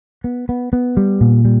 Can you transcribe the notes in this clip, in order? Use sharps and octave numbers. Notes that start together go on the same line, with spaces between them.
B3
B3
B3
G3
A#2
G3